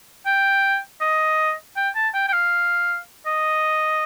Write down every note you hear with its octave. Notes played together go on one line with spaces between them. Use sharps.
G5
D#5
G5
A5
G5
G5
F5
D#5